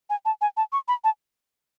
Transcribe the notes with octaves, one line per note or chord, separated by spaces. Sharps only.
G#5
A5
G#5
A5
C#6
B5
A5